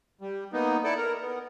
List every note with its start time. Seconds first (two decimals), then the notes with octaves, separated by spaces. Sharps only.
0.21 G3
0.53 A#3 B3 D#4
0.84 E4 A4 D5
0.97 A#4
1.21 B3